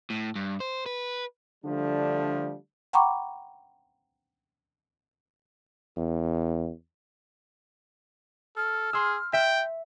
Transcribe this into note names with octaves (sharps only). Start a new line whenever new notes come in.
A2
G2
C5
B4
D3 F3 G3 A3 D4
F#5 G5 A#5 B5 C#6 D6
E2
A4 F6
G#4 C6 E6
E5 G5